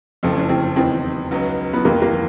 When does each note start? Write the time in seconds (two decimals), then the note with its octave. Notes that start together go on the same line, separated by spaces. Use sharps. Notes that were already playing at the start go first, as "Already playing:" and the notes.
0.23 F#1 F2 C#3 F3 A3 C4
0.36 C#4
0.49 C4
0.76 E2 C3 D#3 C4
1.31 C#2 C#3 F#3 B3 D#4
1.73 B3
1.84 G1 F2 C3 D#3 A#3
2.02 A#3